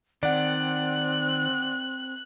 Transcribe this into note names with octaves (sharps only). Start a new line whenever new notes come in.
D#3 C4 D5 F#5 F#6